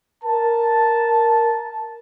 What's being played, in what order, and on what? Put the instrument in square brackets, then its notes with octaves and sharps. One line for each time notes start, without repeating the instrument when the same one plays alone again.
[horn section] A#4 A5